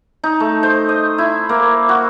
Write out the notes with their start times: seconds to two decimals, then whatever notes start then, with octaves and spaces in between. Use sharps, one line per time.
0.24 D#4
0.40 A3
0.63 C5
0.89 D#5
1.18 E4
1.49 A#3
1.89 F#4